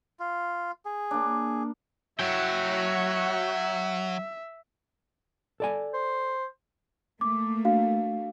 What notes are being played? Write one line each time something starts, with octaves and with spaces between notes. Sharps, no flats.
F4
G#4
A#3 D4
F#3 F#4 C#5 E5 G5
A4 D5 G#5
C5
A3 A#3 D6
D4 F#4 F5